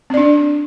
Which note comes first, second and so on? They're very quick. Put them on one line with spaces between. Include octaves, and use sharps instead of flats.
C4 D5 D4